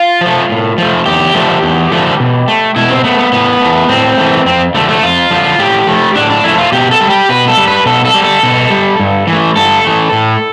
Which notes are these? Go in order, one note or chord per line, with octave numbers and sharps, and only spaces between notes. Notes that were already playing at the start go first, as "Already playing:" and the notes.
Already playing: F4
F3 A3
A2
F3 A3
E2 G4
D3 F3 A3
E2
D3 F3 A3
B2
A3
B2 E4
C4
A3 B3
B3
A2 B3
E3 A3
A2 C4
E3 A3
F2 C4
D3 F3 A3
A3
F2 F4
D3 F3
A2 G4
F3 A3
A2 D4
D4
F3 A3 E4
F4
B2 G4
A4
G3
G4
B2 B4
A4
G3
B4
B2 A4
A4
G3
A4
B2
G3
G2
E3 A3
G2 A4
E3 A3
A2